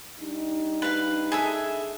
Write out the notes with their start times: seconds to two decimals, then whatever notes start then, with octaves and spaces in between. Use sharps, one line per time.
0.20 G3 D4 D#4
0.82 B4 F5
1.32 G#4 A4 E5